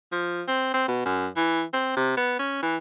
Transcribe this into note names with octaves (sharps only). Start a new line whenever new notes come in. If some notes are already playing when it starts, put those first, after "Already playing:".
F3
C4
C4
B2
F#2
E3
C4
C3
B3
C#4
E3